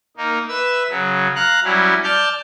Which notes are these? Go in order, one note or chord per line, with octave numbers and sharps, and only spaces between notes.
A#3 D#4
B4 E5 E6
C#3 F#3
F5 A#5 F#6
F#3 G3 C#4 E4
D5 A5 F6 G6